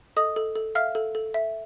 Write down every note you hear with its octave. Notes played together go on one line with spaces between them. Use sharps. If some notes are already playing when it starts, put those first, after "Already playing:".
A4 D#5 D#6
A4
A4
E5 F5 F6
A4
A4
E5